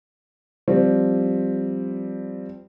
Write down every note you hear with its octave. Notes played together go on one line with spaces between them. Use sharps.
F3 G3 C4